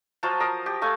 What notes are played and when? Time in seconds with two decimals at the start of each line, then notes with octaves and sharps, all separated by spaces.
0.23 F3 F#3 F4
0.40 A#4 D#6
0.66 G4
0.82 A3 F5 G#5